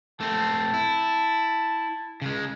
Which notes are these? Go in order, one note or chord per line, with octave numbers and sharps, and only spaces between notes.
A3 C4 A5
E4
C#3 G#3